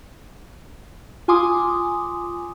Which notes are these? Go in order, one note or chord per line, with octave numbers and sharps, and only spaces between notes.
F4 G#5 C6 D6 D#6